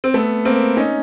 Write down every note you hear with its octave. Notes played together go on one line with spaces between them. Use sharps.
C4
A3 B3
A#3 C4
C#4 D#4